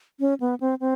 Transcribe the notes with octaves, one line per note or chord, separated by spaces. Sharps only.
C#4
B3
C4
C4